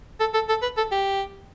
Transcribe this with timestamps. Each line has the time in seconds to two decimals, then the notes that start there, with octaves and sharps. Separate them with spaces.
0.20 A4
0.34 A4
0.49 A4
0.62 B4
0.77 A4
0.92 G4